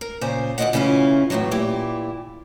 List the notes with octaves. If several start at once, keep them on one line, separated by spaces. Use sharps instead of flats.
A#4
A#2 C#3 C5 G#5 A#5
D2 B2 B3 D4 D#5 F#5
C#3 E3 C#4 E4 F4
E2 A2 C#3 E3 F#3
A#2 E3 E4 G4